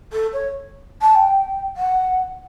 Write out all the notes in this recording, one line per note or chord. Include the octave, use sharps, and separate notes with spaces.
A4
C#5
A5
G5
F#5